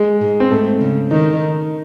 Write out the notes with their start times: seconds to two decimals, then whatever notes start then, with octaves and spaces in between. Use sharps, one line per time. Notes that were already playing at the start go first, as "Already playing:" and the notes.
Already playing: G#3
0.21 G#2
0.40 C4
0.51 G#2 A3
0.81 C#3
1.11 D#3 D#4